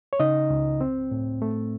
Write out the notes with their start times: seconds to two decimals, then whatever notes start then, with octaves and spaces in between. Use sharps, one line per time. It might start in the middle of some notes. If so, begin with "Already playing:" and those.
0.13 C#5
0.20 C#3 D#4 D#5
0.50 C#2
0.81 C4
1.11 A2
1.42 A3